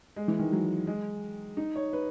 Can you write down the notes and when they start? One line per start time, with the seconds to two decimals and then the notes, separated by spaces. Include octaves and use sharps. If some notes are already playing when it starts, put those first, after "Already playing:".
0.16 G#3
0.28 E3
0.39 D#3
0.52 F#3
0.87 G#3
1.57 D#4
1.76 C#5
1.93 B4